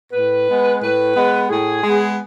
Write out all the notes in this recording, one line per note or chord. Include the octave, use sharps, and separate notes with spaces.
A2 B4
G#3 B3
A2 B4
G#3 B3
A2 G#4
G#3 B3